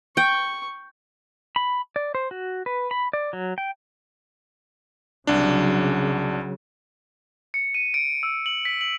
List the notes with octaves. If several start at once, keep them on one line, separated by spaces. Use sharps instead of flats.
G5 C#6
B5
D5
C5
F#4
B4
B5
D5
F#3
G5
C2 C#3 F#3 D4
C#7
D#7
D7
E6
F#7
B6
F#7